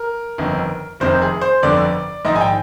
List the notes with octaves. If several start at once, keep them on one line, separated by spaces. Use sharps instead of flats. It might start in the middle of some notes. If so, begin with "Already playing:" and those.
Already playing: A#4
G1 F2 D#3
F1 F2 C3 D#3 C5
G#4
C5
G1 F2 D3 D5
A#1 G#2 D#3 D#5
G#5
G5